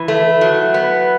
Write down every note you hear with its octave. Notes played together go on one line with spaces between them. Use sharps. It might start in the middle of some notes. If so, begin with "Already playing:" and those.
Already playing: E3
A3
F#3
B3